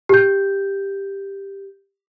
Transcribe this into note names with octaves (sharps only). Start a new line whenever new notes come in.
G4 G6